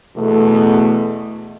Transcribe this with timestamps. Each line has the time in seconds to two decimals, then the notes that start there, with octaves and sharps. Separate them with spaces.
0.16 E2 B2 A3